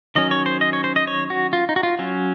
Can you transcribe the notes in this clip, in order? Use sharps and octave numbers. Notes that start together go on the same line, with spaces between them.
D#3 F#3 C#4 D#5
C#5
C5
D#5
C#5
C5
D#5
C#5
F#4
F4
D#4
F#4
F4
F#3 C#4